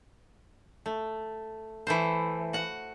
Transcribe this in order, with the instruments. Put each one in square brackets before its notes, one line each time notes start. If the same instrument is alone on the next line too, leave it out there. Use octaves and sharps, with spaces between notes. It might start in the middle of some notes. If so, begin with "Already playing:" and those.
[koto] A3
E3 A3 C5
F#4 F#5